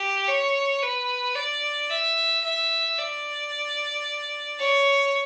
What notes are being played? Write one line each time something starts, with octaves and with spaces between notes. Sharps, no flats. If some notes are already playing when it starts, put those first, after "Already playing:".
Already playing: G4
C#5
B4
D5
E5
E5
D5
C#5